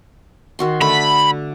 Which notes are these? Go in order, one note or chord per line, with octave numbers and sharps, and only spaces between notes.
D#3 F#4 C6
D3 A3 B5